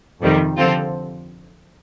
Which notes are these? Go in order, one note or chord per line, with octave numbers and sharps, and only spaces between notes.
F2 C3 D#3 G3
D3 F3 C4 F4 A4